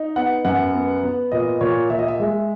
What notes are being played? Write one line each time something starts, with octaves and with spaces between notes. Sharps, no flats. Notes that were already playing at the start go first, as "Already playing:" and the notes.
Already playing: D#4
B3 F#5
F#2 F#5
B3
B3
A#2 D#5
A#2 C#5
A#2 E5
D#5
E5
G#3